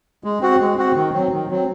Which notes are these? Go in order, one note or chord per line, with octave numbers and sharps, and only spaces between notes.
G#3
C4 F#4
G#3
C4 F#4
D#3
F#3 C4
D#3
F#3 C4